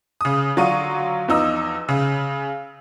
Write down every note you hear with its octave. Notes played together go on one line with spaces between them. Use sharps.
C#3 D#6
D3 F#3 F4 C#6 D#7
E2 F3 D#4 E6
C#3